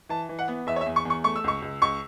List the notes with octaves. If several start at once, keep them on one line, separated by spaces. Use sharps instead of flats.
E3 A5
E3
F#5
B3
E2 E5
C#5
E5
E2
C#6
E2
C#6
A3 C#6
E6
C#2 C#6
C#2
C#2 C#6